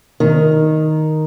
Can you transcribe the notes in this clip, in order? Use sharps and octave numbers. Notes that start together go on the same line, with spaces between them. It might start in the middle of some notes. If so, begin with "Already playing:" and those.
D#3